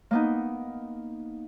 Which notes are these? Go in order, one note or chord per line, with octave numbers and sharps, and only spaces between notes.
A#3 B3 D#4